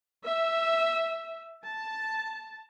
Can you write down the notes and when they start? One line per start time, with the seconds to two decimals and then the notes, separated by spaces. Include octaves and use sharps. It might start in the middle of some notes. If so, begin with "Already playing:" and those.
0.24 E5
1.64 A5